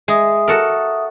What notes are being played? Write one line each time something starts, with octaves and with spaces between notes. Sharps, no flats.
G#3 E5 D#6
F#4 A4 A#4